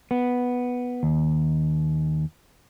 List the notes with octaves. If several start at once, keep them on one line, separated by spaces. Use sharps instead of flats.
B3
D#2